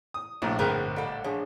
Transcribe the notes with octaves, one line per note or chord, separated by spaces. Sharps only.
D#6
A#1 A2 C3
G1 B3 C4 G#4 A#4 F#5
G3 A4 D5 D#5 F#5
F3 D4 G#4 C#5